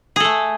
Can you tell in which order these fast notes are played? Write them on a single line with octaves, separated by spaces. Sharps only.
G#4 A4 A3